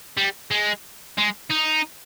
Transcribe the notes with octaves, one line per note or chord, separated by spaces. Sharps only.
G3
G#3
G#3
D#4